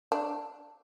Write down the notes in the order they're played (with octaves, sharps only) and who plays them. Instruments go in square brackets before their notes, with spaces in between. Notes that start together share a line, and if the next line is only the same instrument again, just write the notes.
[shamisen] D4